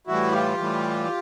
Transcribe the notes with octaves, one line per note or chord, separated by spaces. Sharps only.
A2 E3 G3 E4 F#4
F4 G4
A2 E3 G3